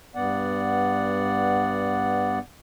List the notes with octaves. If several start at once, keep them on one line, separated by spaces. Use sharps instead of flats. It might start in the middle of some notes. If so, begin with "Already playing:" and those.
G2 B3 D5 F#5